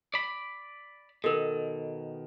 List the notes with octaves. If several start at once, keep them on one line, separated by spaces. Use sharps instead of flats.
D5 B5
B2 D#3 A4 A#4